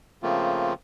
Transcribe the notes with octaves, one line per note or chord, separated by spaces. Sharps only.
C#3 F3 A3 A#3 C4 F4